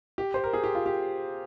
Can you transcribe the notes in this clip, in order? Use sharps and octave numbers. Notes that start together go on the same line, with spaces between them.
G4
C5
A#4
G#4
G4
F4
G4